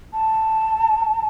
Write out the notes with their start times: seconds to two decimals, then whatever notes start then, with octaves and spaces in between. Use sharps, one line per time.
0.14 A5